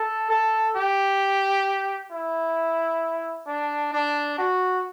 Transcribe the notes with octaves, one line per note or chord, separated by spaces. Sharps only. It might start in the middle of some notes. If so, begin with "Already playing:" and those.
Already playing: A4
A4
G4
E4
D4
D4
F#4